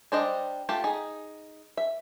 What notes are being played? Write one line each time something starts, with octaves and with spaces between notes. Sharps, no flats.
G3 D4 C5 D5 D#5
A3 F4 G4 A5
D#4 G#4
E5